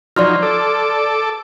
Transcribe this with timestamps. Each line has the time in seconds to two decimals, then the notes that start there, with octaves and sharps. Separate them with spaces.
0.16 F3 F#3 D#4 D5 C6 F6
0.42 A4 D6